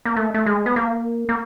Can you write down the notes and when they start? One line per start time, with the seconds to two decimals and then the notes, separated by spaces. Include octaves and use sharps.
0.05 A#3
0.16 A3
0.34 A3
0.46 G#3
0.66 B3
0.76 A#3
1.29 A#3